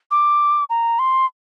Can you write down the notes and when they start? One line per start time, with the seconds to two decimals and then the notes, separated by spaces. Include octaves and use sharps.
0.11 D6
0.70 A#5
0.99 C6